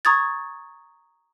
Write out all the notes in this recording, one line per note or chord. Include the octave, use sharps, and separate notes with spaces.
A#5 C#6 D#6 G#6 A6